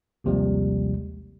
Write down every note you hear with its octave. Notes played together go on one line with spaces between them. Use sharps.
A#1 D#2 C3 F3 G3 G#3